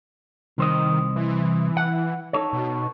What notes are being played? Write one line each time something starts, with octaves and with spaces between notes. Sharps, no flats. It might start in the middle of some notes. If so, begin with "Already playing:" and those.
C2 D#3 C5 D#5
E3
F#5
D#4 A4 C#5
B2